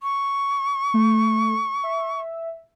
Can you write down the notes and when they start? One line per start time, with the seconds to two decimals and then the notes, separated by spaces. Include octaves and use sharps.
0.03 C#6
0.94 A3
1.83 E5